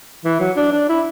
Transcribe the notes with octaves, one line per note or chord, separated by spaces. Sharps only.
E3
F#3
D4
D4
E4